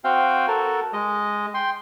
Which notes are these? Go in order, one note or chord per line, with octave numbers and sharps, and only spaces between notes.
C4 F#4 F5 G5
F#4 A4 A#4
G#3 D#5
G5 C6